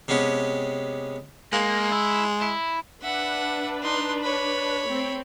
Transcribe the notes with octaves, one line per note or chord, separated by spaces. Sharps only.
C3 G#3 B3 C#4 G4
G#3 A#3
E4
E4
D4 B4 E5 F#5
D#4 C6
C#5 B5
A3 C4